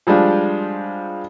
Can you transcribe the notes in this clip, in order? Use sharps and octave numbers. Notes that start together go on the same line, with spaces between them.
F3 G3 G#3 D4 F4